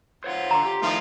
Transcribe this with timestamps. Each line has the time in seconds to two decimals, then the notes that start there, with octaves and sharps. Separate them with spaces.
0.24 F4 C5 C#5 F#5
0.51 D3 A#5 C6
0.65 G4
0.82 D#3 F3 A3 E4 F4 D#5